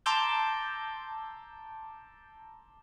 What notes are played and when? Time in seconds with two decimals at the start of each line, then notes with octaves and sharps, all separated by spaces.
0.06 A5 A#5 C6 D6 E6 G6